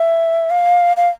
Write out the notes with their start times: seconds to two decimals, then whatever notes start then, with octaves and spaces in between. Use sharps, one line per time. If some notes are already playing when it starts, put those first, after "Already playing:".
Already playing: E5
0.50 F5
0.97 F5